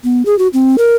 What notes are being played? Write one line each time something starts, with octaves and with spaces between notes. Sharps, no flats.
B3
G#4
F#4
C4
A#4